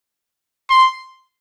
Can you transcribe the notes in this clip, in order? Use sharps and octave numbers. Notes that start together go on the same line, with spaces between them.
C6